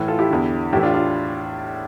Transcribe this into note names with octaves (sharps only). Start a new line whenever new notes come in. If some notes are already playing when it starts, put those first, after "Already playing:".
Already playing: A2 E3
F4 A4
E4 G4
E2 D3
A2 E3 E4 G4
D4 F4
D4 F4